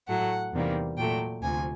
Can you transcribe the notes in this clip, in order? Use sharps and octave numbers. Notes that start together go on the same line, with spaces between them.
A2 F#3 A3 F#5
E2 C3 D#3 G3 A#3
A#2 F#3 A3 G5
D2 C3 F3 G#5